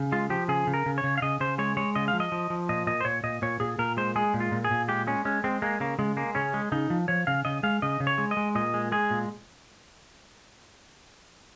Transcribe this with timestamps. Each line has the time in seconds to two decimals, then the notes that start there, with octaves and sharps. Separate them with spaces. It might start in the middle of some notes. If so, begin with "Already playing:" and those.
Already playing: C#3
0.12 G#3 F4
0.30 F3 G4
0.48 C#3 G#4
0.67 C#3
0.74 A#4
0.86 C#3
0.98 C#5
1.04 C#3
1.18 F5
1.22 C#3 D#5
1.40 C#3 C5
1.58 G#3 C#5
1.77 G#3 C#5
1.95 C#3 D#5
2.08 F5
2.13 F3
2.20 D#5
2.32 F3
2.50 F3
2.69 A#2 D#5
2.87 A#2 D#5
3.01 C5
3.05 A#2 C#5
3.24 A#2 D#5
3.42 A#2 C#5
3.60 A#2 G#4
3.79 A#2 A#4
3.97 G#3 C5
4.16 G#3 G#4
4.34 A#2
4.40 F4
4.52 A#2
4.64 G#4
4.71 A#2
4.88 G#3 G4
5.07 G#3 C#4
5.25 G#3 C#4
5.44 G#3 C4
5.62 G#3 A#3
5.80 C#3 A#3
5.99 C#3 G#3
6.17 G#3 A#3
6.35 C#3 C#4
6.54 G#3
6.72 C#3 D#4
6.90 F3
7.08 F3 C#5
7.27 C#3 F5
7.45 C#3 D#5
7.63 G#3 F5
7.82 C#3 D#5
8.00 C#3
8.07 C#5
8.18 G#3
8.31 D#5
8.37 G#3
8.55 A#2 D#5
8.74 G#3
8.92 G#3 G#4
9.11 A#2